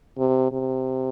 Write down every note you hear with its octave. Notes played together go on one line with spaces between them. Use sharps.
C3
C3